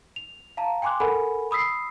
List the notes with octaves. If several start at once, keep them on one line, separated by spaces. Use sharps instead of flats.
F7
F5 A5 A#5
G5 G#5 C6 D6 F#6
A4 A#4 F#5 G#5 B5
B5 D#6 E6 B6 C7